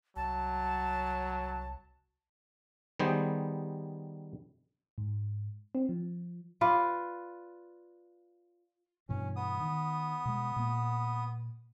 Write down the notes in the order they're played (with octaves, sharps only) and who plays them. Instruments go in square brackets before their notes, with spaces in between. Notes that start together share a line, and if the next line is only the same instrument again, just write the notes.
[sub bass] C2 [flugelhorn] F#3 [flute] A5
[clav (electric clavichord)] D#3 G3 B3 G#4 C5
[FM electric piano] G#2
C4
F3
[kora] F4 B4 D5
[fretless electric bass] G2 B2 E3 [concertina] C#4
[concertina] B3 D#6
[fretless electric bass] D#3
B2 G#3
A#2 A#3